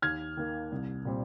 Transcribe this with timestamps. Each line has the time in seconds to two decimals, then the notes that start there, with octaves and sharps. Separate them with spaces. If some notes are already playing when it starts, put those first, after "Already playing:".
0.02 D#2 F6 G#6
0.37 D#3 A#3
0.72 C2
1.05 A#2 G3 C4